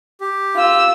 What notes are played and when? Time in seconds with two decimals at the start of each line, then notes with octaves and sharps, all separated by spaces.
0.21 G4
0.56 F4 E6